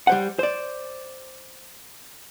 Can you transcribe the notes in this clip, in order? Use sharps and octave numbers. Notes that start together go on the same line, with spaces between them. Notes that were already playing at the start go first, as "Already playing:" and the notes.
G3 C5 F#5
C5 D5